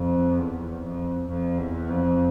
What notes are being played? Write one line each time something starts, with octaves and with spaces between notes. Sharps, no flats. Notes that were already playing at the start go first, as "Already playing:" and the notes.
Already playing: F2
E2
F2
F2
E2
F2